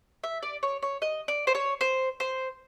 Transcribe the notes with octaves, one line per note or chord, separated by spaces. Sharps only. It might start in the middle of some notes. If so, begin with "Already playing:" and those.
E5
D5
C#5
C#5
D#5
D5
C5
C#5
C5
C5